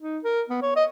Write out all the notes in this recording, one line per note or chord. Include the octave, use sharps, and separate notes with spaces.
D#4
A#4
B3
C#5
D#5